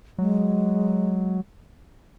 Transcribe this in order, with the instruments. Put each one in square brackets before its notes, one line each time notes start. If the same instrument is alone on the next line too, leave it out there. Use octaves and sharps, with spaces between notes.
[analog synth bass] F#3 [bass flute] G#3